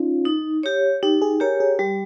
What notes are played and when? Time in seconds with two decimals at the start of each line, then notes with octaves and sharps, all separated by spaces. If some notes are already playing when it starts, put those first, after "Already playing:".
Already playing: C#4 D#4 F4
0.25 D#4
0.63 G4 C#5
1.03 D#4 G4
1.22 G#4
1.40 G4 A#4 C#5
1.60 G#4
1.79 G3 G4